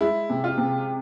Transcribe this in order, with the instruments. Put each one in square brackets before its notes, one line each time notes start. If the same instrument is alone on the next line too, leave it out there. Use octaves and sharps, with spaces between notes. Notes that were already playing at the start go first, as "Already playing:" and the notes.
[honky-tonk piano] G#3 [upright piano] E4
[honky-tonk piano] C3
[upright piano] F4
[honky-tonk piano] C3